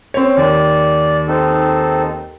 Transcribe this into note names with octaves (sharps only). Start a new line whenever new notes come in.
C4 C#5
D#2 D5
C4 D#4 A4